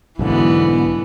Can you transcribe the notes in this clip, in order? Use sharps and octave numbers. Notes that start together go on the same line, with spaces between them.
B1 G#2 D3 E3 B3